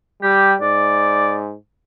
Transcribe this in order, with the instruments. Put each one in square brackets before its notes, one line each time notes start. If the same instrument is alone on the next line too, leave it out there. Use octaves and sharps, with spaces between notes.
[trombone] G3 [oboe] G4
[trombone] G#2 [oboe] D5